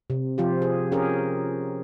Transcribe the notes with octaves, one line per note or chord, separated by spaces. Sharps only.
C3
F3 F4 G4
G#4
C#4 G4 G#4 A#4